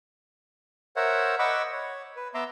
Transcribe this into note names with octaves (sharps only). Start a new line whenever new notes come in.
A#4 C5 C#5 E5 F#5
D#5 F#5 B5 C#6 D6 E6
C#5
B4
B3 E5 A#5 C6 D6